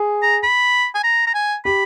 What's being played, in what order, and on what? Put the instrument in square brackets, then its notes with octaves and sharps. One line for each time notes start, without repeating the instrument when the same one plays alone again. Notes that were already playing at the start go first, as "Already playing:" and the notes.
Already playing: [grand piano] G#4
[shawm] A#5
B5
G#5
A#5
A#5
G#5
[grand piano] G4 [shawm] B5